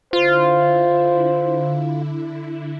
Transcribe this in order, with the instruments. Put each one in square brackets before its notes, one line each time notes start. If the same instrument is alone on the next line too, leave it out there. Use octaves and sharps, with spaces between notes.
[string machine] D3 E4 [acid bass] F4 [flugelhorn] C5